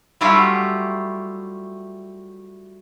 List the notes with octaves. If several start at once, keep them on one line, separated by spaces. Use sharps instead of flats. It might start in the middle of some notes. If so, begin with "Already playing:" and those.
F#3 G3 A3 E4 F4 G4